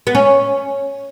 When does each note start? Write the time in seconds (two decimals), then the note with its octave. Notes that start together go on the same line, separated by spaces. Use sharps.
0.07 B3
0.15 C#4